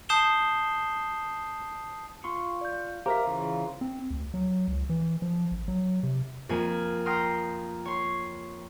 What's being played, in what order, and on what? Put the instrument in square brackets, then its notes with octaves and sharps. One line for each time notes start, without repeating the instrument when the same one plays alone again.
[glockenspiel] A5 D#6 G6 C7 E7 G7
[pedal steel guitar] F4 C6 C#6
[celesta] D5 G6
[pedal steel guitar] G4 A#4 E5 [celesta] C5 F5 A#5
[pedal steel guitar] C#3 E3 F4
[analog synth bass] C4
D2
F#3
C#2
E3
F3
A1
F#3
C3
[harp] F2 A#3 G#5
G5 A#5 C6 D#6 F6
C#5 C6